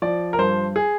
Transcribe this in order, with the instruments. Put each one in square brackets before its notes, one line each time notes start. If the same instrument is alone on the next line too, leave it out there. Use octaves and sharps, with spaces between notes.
[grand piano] F3 D5
A#4
G2 C5
G#4